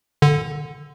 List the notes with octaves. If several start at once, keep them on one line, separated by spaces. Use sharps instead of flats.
D3